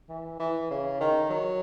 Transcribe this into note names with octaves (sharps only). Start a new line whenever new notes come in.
E3
E3
C#3
D#3
F#3